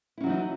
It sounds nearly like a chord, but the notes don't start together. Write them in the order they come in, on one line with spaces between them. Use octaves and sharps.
E4 C#4 F#3 E3 D#4